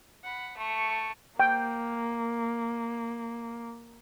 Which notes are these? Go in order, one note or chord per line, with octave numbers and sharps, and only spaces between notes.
F#5 B5
A3 C#6
A#3 G5